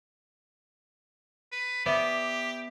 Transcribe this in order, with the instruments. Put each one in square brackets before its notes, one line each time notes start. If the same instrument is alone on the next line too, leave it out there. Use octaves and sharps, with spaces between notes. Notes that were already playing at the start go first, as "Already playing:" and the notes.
[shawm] B4
[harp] B3 D5 E5 [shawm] G4